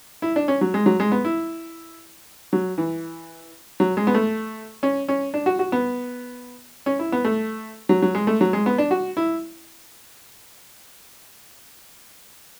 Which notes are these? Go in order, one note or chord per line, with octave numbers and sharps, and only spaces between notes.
E4
D4
C#4
F#3
G#3
F#3
G#3
B3
E4
F#3
E3
F#3
G#3
B3
A3
C#4
C#4
D4
F#4
F#4
B3
C#4
E4
B3
A3
F#3
F#3
G#3
A3
F#3
G#3
B3
D4
F#4
E4